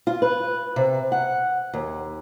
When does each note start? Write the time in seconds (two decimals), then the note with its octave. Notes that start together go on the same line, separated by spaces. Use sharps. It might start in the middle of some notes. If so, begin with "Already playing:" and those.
0.07 F4
0.22 B4
0.76 C3
1.12 F#5
1.74 D#2